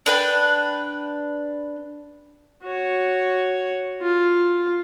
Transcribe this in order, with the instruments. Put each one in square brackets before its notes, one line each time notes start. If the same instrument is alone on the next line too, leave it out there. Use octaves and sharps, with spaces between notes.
[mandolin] D4 B4 G5
[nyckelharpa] F#4 C#5
F4